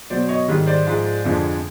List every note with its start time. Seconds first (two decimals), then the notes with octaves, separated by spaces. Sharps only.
0.10 B2 F#3 C5 D5
0.29 C#5 D#5
0.48 G#2 D#3 G3
0.67 C5 D5
0.87 G#2 F3 G#3
1.24 F2 D3 F3 G#3